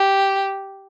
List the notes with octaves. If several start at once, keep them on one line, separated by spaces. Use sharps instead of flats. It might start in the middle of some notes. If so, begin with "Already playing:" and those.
Already playing: G4